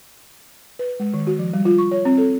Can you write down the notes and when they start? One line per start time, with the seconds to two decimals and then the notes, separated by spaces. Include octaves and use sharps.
0.79 B4
1.00 G#3
1.14 D#3
1.27 F#4
1.39 F3
1.53 G3
1.65 F4
1.78 C#6
1.91 C#5
2.05 C4
2.18 A4